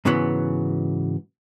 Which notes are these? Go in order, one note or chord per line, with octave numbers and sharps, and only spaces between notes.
G#2 C#3 E3 F#3 B3